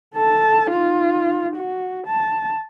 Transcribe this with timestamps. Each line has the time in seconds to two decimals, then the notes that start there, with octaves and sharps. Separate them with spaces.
0.16 A4 A5
0.71 D#4 F4
1.56 F#4
2.07 A5